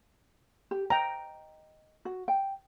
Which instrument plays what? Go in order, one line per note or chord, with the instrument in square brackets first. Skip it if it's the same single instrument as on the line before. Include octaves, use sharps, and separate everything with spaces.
[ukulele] G4
[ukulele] D#5 [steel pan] G5 A#5
[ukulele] F#4
G5